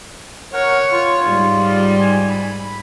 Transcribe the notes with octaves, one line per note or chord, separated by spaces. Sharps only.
A#4 C#5 F#5
F4
G#2 G3
G#5
B5